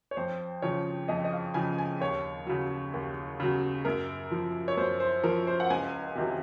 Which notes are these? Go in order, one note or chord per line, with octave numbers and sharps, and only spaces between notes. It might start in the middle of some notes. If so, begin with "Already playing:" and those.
C#5
F2 C5
C#3 F3 C#5
F2 D#5
D#5
F5
C#3 F3 G#5
G#5
D#2 C#5
C#3 F#3
D#2
C#3 F#3
F#2 A#4
F3
C#5
F#2 C5
C5
F3 A#4
C5
F#5
C#2 G#5
C3 D#3 F#3